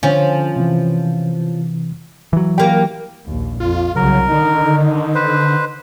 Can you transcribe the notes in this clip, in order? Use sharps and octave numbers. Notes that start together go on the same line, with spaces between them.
D3 F3 C#4
C3 E3
E3 F#3
G3 A#3 G5
A#1 D#2
F2 F4
C2 C#3 F#3 A#4
D3 D#3 D#4
B4 C5